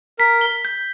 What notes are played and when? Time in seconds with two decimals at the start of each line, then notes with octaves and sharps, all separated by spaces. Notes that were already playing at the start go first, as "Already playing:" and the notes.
0.19 A#4 B6
0.41 G7
0.65 G6